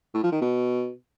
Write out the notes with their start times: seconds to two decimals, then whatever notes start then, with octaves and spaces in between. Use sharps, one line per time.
0.14 A2
0.23 F3
0.32 D#3
0.41 B2